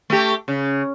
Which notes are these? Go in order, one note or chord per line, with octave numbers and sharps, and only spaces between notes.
A3 G4
C#3